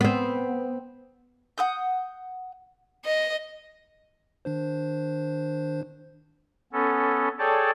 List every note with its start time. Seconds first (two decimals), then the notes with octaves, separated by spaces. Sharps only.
0.01 B3 C4
1.58 F#5 D#6 G6
3.05 D#5
4.45 D#3 D4 C5
6.73 B3 C#4 A4
7.39 G#4 A4 C#5 D5 G5 A5